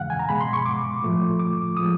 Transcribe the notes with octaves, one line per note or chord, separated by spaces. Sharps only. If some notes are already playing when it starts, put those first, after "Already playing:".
Already playing: E2 C#3 E3 G#3 F5 F#5
G#5
A#5
B2 G#3 B5
C6
C#6
D6
A2 F3 A3
D6
F3 G#3 D#6